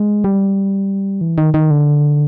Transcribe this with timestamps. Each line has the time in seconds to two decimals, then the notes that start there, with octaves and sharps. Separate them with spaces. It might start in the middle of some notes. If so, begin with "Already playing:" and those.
Already playing: G#3
0.24 G3
1.21 E3
1.38 D#3
1.54 D#3
1.71 D3